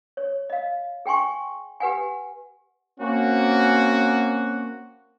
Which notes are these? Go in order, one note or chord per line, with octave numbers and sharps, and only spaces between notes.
C#5
D#5 F5
G#4 G5 G#5 C6 C#6
G4 B4 F#5 G#5
A#3 C4 C#4 F#4